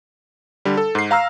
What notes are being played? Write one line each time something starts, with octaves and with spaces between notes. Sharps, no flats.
D3 G3
A4
G#2 C7
F5 A#5 E6 F6